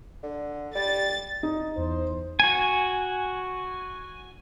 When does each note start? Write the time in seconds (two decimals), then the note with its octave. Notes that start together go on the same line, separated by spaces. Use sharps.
0.23 D3
0.75 G3 A6
1.43 D#4
1.77 E2 C5
2.40 F#4 G#5